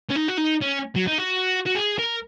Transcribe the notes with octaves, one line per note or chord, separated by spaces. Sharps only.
C#4
D#4
F#4
D#4
C#4
F#3
D#4
F#4
F#4
G#4
A#4